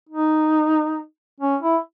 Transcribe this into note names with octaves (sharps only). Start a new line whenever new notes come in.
D#4
C#4
E4